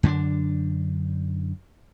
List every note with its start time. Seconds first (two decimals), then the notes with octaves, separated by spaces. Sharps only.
0.03 F#2 D3 C4 D4